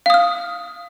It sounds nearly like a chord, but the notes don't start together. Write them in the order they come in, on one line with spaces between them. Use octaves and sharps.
F5 D#6 F6